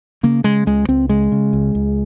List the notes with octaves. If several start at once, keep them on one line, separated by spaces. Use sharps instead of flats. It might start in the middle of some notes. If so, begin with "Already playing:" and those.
C#3 A#3
C#3 G#3
C#2 G#3
C#2 C4
C#3 G#3
C#3
C#2
C#2